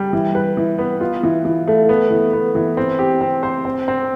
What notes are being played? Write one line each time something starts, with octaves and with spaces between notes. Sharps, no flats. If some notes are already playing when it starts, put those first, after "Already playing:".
Already playing: G3
E3
B4
E3
B3
F4
E3
E3
A3
B3
E3
B3
E3
C4
G4
C4
C5
C4
C4